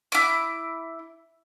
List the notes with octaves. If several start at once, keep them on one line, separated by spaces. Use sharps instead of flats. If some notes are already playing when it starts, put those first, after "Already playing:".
E4 D6